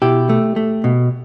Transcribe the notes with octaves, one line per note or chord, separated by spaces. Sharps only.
B2 E4 G4
A3
A3
B2